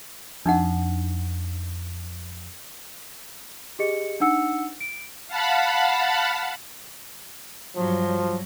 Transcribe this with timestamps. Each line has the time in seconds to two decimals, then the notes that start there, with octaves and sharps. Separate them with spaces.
0.46 F2 D4 D#4 F#5
3.79 G4 G#4 D#5 C#7
4.20 D4 D#4 F#5 E6 C#7
4.81 D7
5.28 F5 F#5 A5 B5
7.76 G2 F3 F#3